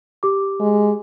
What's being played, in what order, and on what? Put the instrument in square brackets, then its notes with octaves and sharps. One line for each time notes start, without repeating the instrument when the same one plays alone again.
[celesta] G4 D6
[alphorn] G#3